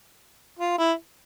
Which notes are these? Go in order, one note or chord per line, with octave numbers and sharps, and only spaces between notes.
F4
E4